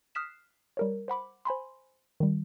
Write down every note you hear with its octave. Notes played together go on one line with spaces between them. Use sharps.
D#6 F6 F#6 B6 C7 E7
G3 A#4 C#5
C5 F#5 B5 D6
C5 G#5 B5 C6
D#3 G3